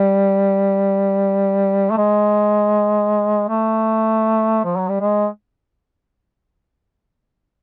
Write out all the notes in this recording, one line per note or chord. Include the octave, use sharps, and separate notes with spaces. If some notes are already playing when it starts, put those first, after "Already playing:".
Already playing: G3
A3
G#3
A3
F3
F#3
G3
G#3